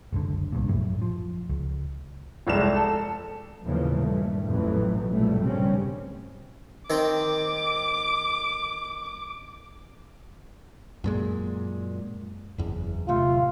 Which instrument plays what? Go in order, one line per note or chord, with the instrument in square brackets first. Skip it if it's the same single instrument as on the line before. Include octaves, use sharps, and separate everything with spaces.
[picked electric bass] F#1 C#2 D3
C2 G2 A#2
A#1 F#2 A2
F3
C#2
[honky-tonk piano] F1 C2 G#3 E7
A4
[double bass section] D#2 A2 C#3 E3 F3
G2 A#2 A3
A1 F2 B2 E3 F#3 A3
A#1 G2 B2 F#3 G3 A3
G2 C#3 G3 C4 C#4
[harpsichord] D#3 C4 G5 [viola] D6
[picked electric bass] F#2 A#2 G#3
F#1 E2
[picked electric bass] D1 C3 A3 [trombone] F4